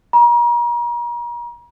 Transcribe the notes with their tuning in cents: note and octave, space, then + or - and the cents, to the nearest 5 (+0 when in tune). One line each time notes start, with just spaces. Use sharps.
A#5 +40